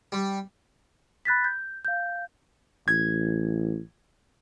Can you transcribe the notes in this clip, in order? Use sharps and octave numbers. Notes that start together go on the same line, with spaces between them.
G3
B5 F#6 A6 B6
G6
F5 G6
A1 G#6